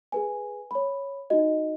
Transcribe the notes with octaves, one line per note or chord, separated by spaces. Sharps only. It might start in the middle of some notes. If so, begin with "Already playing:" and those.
G#4 B4 G#5
C#5 B5
D#4 F#4 D#5